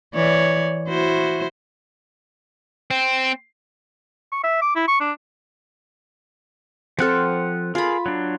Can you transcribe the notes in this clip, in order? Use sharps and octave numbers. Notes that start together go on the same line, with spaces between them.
E3 C#5 D5
E4 F#4 C5
C4
C#6
E5
D6
E4
C#6
D4
F3 C4 A4 F#5 F6
F4 G#4 A#4 B5
F#3 D4